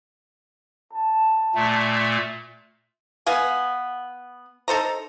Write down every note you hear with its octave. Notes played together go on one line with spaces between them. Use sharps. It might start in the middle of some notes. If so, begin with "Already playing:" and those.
A5
A#2 A3
B3 F5 G#5
D#4 A4 C5 A#5